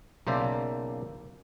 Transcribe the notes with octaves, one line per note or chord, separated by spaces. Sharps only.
B1 C#3 A#3 C5 D5 E5